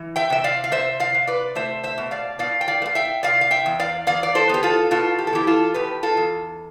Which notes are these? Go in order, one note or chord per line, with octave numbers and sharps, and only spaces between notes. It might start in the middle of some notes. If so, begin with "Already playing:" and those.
Already playing: E3
E5 G5
C3 E5
D5 F5
F5
C3 C5 E5
D5 F5
C3
B4 D5
A3 C5 E5
C5 E5
B2
D5 F5
B2 D5 F5
G5
D5 F5
A3
F5
E5 G5
C3 D5 F5
F5
E5 G5
E2
D5 F5
E2 D5 F5
D5
A4 C5
B3 G4
F4 A4
B2 F4 A4
G4
A4
E2 E4 G4
F4 A4
B2 G4 B4
F4 A4
E2